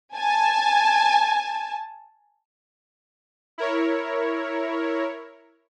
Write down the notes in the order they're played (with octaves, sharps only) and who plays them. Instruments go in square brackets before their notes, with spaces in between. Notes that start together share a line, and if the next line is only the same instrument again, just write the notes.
[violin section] G#5 A5
[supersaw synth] E4 A#4 C#5